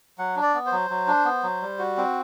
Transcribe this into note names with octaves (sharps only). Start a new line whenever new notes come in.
F#3 F#5
D4
D5
B3
C5
F#3
F#3
D4
B3
F#3
G3
F#4
C4